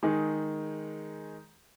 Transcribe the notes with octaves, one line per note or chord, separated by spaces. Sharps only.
D#3 G#3 D#4 G#4